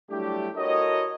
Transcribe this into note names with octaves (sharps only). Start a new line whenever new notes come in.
F#3 G3 A3 D4 E4 G4
E4 F#4 A4 A#4 C#5 D#5